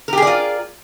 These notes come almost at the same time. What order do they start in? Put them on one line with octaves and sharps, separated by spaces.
A#4 G4 G#4 D5 F4